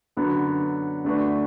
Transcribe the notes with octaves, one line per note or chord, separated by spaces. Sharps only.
F#2 D3 F#3 B3
D3 A3 D4 F#4 B4